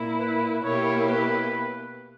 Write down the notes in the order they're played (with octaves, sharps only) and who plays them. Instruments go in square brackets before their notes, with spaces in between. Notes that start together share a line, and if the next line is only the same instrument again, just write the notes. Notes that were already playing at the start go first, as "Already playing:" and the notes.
Already playing: [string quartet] A#2 A#3 E4
[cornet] B4
[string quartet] B2 A#3 E4 G4 [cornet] C#5
[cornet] B4